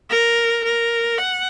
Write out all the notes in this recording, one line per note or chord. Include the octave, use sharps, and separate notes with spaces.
A#4
A#4
F#5